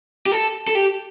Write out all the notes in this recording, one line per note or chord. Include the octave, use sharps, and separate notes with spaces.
G4
A4
A4
G4